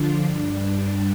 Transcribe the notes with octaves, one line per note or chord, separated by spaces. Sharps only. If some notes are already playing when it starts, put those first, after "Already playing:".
Already playing: D3 F3 D4 F4
G2 G3 D4